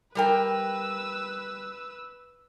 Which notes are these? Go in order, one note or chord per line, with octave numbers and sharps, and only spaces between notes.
G3 A#4 B4 G5 E6